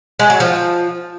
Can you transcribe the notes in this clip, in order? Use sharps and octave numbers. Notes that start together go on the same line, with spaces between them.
G#3
F#3
F3